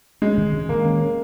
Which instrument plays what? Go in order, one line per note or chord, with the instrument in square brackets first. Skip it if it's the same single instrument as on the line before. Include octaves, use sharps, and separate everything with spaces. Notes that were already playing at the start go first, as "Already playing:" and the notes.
[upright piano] G#3 [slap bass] C#4
[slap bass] D#3
D#3
[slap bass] D#3 [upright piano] A#3
[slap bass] C#4